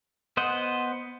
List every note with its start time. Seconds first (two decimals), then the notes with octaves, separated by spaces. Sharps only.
0.37 B3 C5 D#5 F#5